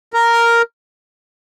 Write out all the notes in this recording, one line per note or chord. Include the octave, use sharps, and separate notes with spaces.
A#4